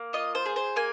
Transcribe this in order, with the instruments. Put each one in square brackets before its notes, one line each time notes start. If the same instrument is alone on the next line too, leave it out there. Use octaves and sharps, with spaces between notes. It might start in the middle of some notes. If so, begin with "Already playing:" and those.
Already playing: [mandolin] A#3
F4 D#5
C5
G#4
C5
A#3 G#5